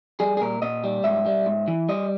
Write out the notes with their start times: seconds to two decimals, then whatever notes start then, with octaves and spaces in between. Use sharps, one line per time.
0.20 G3 G#4
0.37 G#4
0.41 A#2 A#4
0.62 A#2 D#5
0.84 G3
1.04 G#2 E5
1.26 G3
1.46 G#2
1.68 E3
1.89 G3 D#5